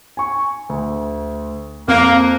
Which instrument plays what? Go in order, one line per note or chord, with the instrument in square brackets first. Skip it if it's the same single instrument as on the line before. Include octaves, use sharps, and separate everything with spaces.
[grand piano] G#5 C#6
D2
[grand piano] F2 C4 F#6 [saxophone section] A#3